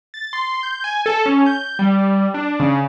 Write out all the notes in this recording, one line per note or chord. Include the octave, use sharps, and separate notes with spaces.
A6
C6
G6
G#5
A4
C#4
G6
G3
D4
C#3